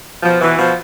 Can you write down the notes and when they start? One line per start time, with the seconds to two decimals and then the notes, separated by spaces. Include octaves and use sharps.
0.22 B2 F3
0.41 B2 E3
0.58 B2 F3